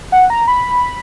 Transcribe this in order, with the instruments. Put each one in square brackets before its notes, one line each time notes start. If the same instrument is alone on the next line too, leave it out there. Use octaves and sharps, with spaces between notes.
[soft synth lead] F#5
A#5
B5